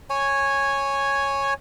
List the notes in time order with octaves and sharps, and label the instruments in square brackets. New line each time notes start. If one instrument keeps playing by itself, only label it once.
[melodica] C#5 G#5